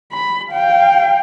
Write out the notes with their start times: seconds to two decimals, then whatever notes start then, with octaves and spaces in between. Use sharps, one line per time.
0.13 B5
0.51 F5 G5